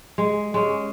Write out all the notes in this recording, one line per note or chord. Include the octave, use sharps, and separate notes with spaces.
G#3
G#3 C#4